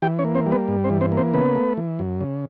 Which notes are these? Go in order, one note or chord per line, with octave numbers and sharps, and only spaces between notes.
E3 G4 G5
C#4 C#5
A#3
C4 C5
G3
B3 B4
G2
C4 C5
E3
C4 C5
A#3
C4 C5
C#3 B3 B4
A3
E3
F#2
C#3